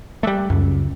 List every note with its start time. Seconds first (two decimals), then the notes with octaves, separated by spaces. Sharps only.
0.23 G3 A3 D6 E6 F#6
0.50 C#2 F#2